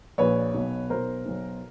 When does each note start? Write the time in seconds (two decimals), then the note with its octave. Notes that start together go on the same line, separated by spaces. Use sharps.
0.18 A#1 A#2 B4 C#5
0.54 B1 B2
0.90 B1 B2 A#4 C5
1.26 B1 B2